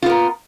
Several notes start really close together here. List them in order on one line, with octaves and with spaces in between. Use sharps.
F4 B3 A#4